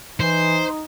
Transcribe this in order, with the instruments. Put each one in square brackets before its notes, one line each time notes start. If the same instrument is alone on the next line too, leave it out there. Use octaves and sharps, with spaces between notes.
[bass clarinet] E3 [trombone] D#4 [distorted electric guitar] C5